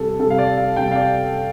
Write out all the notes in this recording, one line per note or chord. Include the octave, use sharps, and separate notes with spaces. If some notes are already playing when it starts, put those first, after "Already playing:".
Already playing: C3 G3 A4
C3 G3 A4
F5
D5
F5
C3 G3 G5
F5
D5